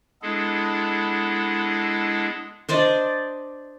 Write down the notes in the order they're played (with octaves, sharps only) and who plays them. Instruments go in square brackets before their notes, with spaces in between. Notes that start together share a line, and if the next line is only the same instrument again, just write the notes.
[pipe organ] G#3 B3 D4 E4 G#4 A4
[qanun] D4 C5 D5 D#5